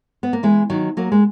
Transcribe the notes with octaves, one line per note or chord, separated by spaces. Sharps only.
B3
A#3
E3 G#3
D#3 F#3
F#3 A#3
G#3